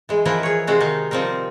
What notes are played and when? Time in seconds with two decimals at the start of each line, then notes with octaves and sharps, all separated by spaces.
0.09 E3 G#3
0.25 E3 F3 E4 A#4 B4
0.43 G#4 C#5
0.67 C3 G#3 C4 F#4
0.80 D#3 D#4 F5
1.11 F3 G3 C4 D#4 A#4